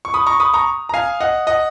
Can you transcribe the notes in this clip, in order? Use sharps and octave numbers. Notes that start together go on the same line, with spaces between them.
C#6
B5 D#6
A#5 C#6
B5 D#6
A#5 C#6
A#5
F5 G#5
D#5 F#5
D#5 F#5